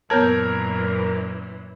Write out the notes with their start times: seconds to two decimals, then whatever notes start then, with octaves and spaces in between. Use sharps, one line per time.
0.10 F#2 A#2 E3 B3 A#4 C#5 A5 G#6